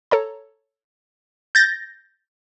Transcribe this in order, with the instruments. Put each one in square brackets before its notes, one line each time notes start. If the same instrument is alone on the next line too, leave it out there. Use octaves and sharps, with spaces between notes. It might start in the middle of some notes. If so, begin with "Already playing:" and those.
[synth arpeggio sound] A4 C#5 A#5
[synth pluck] G6 A6 A#6